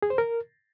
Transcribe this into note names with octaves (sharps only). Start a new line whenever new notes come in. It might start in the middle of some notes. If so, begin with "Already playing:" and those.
G#4
C5
A#4